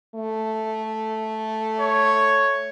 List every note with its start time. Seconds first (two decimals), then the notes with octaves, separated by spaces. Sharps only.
0.15 A3
1.81 C#5